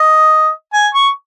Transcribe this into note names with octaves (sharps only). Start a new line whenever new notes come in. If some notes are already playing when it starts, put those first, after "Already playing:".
Already playing: D#5
G#5
C#6